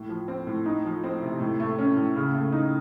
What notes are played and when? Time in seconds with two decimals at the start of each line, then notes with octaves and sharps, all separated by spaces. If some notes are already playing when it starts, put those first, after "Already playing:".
Already playing: A2
0.09 F3
0.28 C4
0.47 A2
0.66 D#4
0.85 F3
1.04 C4
1.22 C3
1.40 A2
1.60 A3
1.78 C#4
1.96 A2
2.16 C#3
2.34 A3
2.52 D#4